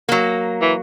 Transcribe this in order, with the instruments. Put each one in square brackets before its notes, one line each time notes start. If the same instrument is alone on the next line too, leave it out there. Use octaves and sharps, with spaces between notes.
[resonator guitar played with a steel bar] F#3 A#3
[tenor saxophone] E3